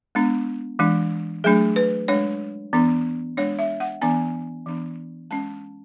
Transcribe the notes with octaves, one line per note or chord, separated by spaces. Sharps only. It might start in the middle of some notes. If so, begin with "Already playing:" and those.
G#3 B3 D4
E3 G#3 D4
F#3 A3 D4 G#4
B4
G#3 D4 C#5
E3 B3 D4
G#3 D4 C#5
E5
F#5
E3 B3 D4 G#5
E3 B3 D4
G#3 C#4 A5